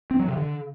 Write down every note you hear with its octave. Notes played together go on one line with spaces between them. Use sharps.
C4
F#3
C3
D3